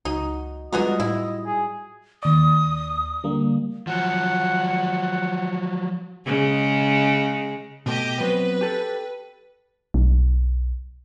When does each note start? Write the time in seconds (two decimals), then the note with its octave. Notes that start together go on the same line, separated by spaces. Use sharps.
0.05 C#2 D#4 F#4
0.73 D3 G3 G#3 B3 F4 F#4 A#4 D#5
1.00 A2 E4
1.46 G#4
2.23 D#2 D5 D#6
3.23 D3 G3 A#3
3.87 F3 F#3 F#5
6.26 C#3 G#3
7.86 B2 A3 G4 D#5
8.20 F#3 B3 C4 B4
8.61 G4 A4
9.94 B1